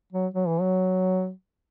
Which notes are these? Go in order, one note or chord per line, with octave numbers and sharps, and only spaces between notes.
F#3
F#3
E3
F#3